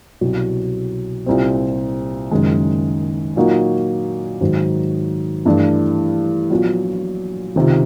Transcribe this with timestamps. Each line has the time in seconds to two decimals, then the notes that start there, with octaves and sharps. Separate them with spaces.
0.21 C2 B2 F#3
1.26 C2 A#2 G3 C4
2.31 F#1 F#2 D#3 G#3
3.36 A#2 F#3 A#3 D#4 F#4
4.41 G#2 D#3 F#3
5.45 G2 E3 A3 D4
6.50 A#1 A#2 F#3 B3
7.56 C#2 C3 D#3